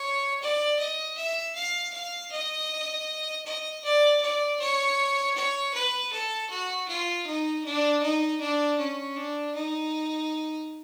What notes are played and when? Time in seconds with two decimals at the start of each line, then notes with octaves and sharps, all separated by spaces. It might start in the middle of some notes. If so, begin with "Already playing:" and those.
Already playing: C#5
0.41 D5
0.79 D#5
1.17 E5
1.56 F5
1.93 F5
2.32 D#5
3.46 D#5
3.84 D5
4.22 D5
4.60 C#5
5.36 C#5
5.74 B4
6.12 A4
6.50 F#4
6.88 F4
7.27 D#4
7.65 D4
8.02 D#4
8.40 D4
8.79 C#4
9.16 D4
9.55 D#4